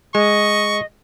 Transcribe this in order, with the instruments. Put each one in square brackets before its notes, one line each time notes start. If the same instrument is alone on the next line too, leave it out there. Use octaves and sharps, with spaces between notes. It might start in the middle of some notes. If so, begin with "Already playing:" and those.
[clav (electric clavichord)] G#3 [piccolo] D#5 [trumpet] C#6